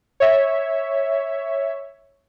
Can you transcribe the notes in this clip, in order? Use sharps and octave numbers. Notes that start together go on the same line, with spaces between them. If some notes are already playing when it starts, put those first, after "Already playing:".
C#5 E5